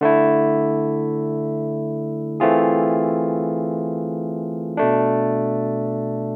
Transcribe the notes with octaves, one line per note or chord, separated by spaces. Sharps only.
D3 A3 E4
E3 A3 C4 F4 G#4
B2 A3 D4